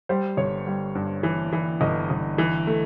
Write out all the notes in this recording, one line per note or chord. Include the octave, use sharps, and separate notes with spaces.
G3 C5
G1 C#5
G3
G2
E3
E3
G1 D#5
G1
E3
A3